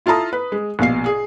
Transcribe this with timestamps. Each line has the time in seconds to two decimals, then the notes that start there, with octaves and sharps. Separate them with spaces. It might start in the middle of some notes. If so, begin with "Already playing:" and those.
0.06 E4 F4 A4 A5 A#5 D#6
0.33 B4
0.52 G#3
0.79 A#1 B2 F5 C7
1.06 G#4